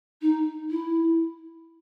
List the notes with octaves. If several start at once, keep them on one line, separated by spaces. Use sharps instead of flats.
D#4
E4